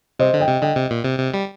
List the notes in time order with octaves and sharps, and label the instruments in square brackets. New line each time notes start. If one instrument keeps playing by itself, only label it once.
[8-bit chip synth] C3 [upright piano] C5 D#5
[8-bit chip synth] D3
[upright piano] D#5 G5
[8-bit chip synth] C3
[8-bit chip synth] D3 [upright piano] D#5 G5
[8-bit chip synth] C3
A#2
C3
C3
G3